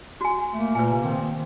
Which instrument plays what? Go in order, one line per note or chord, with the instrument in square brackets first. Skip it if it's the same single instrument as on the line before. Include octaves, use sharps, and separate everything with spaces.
[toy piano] F#4 G#5
[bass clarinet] A3 [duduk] A#3
[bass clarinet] A#2 [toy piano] B4 G#5
[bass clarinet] C3
[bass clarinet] D#3 [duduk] C4